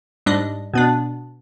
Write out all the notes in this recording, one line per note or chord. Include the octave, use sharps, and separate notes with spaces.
G#2 G3 D4 D#5
B2 B3 D4